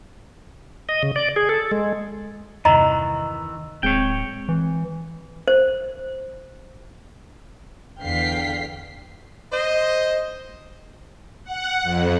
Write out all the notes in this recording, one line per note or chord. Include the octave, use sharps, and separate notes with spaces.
D#5
C#3
D5
G#4
A4
G#3
E2 G2 C3 D#3 E3 D#5 A#5
D1 G#3 C4 C#5 G5
E3
C5
E2 D3 F5 G5 B6 C7
C5 D#5
F#5
F2